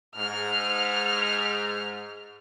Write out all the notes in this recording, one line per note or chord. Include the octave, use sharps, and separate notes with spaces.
G#2 F6